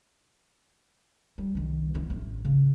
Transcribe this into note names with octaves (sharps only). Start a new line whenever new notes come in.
G3
C2 D#3
B3 E4
A1
C#3